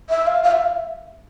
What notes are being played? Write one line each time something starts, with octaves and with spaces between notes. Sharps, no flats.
E5
F5
F5
E5